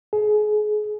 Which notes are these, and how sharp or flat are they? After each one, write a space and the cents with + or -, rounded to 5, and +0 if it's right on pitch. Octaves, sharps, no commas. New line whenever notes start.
G#4 +30